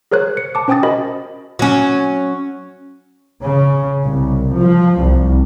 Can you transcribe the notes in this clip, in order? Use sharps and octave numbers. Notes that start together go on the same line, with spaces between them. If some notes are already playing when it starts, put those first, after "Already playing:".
G#4 A#4 C5 C#5 F#6
C#7
A5 D6
C#4 C5 G5 G#5 D#6 A6
F#4 A#4 D#5 B5
F#3 C#4
C#3
C2
F3
C2